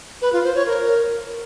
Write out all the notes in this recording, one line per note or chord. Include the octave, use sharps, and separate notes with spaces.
B4
F4
C5
C#5
A#4